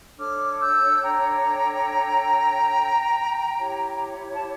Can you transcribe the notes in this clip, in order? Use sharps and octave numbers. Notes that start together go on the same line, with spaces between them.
D4 A4 C#5 D6 F6
E6 G6
G5 A#5
E4 G4 C#5
A5